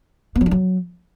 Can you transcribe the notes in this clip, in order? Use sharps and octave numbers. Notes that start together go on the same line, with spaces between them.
B3
F#3
D4
F#3